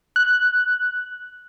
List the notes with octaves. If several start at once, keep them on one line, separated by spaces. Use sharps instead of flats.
F#6